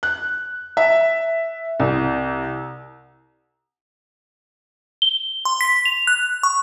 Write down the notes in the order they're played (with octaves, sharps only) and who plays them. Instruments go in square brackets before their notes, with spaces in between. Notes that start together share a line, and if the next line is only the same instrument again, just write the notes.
[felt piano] F#6
E5
C2
[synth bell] G7
C6
B6
F7
F#6
C#6